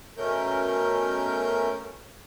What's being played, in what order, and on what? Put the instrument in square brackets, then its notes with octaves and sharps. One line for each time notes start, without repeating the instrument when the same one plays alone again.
[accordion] B2 A3 C#4 A#4 G6